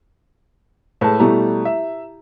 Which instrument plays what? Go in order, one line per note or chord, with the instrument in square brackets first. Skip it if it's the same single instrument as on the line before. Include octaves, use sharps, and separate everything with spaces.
[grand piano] A2 G#3 [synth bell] B4 A5
[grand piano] B2 G3 A3 [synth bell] E4 G4 A#5
[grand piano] E5